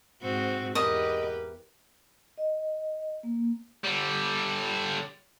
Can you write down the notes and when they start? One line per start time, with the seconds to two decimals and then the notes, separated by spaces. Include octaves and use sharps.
0.22 G#2 C4 F#4
0.75 E2 G4 A#4 B4 D#5
2.38 D#5
3.23 A#3
3.84 D3 G3